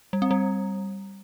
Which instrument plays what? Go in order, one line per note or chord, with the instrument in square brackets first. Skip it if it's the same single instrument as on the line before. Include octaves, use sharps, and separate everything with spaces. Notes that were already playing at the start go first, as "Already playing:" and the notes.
[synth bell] G3
C4
G3